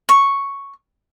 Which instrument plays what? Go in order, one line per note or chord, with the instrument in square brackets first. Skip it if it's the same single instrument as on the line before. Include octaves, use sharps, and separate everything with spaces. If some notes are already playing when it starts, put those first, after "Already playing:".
[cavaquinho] C#6